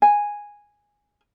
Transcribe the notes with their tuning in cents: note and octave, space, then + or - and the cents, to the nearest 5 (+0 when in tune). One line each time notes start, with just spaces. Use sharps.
G#5 -5